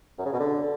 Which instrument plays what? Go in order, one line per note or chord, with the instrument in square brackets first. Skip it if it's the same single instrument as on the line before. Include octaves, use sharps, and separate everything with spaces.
[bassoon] F#2
C#3
B2
D3